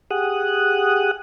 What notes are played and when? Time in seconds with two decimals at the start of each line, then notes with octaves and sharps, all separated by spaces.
0.11 G4 G#4 F#5 D#6 F#6